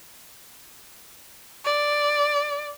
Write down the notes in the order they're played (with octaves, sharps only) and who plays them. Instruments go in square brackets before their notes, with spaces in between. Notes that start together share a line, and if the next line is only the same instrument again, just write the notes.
[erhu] D5